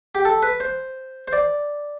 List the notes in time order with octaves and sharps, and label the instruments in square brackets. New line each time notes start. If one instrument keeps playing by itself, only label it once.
[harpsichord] G4
A4
B4
C5
C5
D5